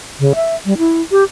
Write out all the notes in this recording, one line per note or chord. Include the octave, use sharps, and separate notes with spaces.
C#3
E5
G3
E4
G4